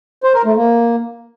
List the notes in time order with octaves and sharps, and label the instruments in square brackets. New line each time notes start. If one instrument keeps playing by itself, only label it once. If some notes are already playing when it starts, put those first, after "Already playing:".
[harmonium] C5
A#4
A3
A#3